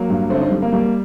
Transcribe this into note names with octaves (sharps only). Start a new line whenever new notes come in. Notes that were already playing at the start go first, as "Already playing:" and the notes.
Already playing: F#3 A#3
G2
D3 A3 C4
C4 D#4
G3
A#3
G3 A#3